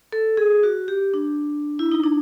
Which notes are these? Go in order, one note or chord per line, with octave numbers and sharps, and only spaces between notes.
A4
G#4
F#4
G4
D4
E4
D#4
D4